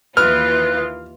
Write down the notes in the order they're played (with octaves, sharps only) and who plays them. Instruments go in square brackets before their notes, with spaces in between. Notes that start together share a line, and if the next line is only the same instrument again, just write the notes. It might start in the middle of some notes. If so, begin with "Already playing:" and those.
[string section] D#2 E3 F4 [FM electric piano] B4 D#6 [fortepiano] F6 [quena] F#6